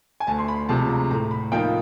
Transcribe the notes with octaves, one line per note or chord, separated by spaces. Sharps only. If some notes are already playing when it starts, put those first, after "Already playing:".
G#5
D2 A5
C6
B5
C3 F3 G#3 A5
A#5
A2 A#5
B5
F3 A#3 D#4 G5